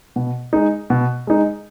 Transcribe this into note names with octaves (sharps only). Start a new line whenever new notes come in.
B2
G#3 D#4
B2
G#3 D#4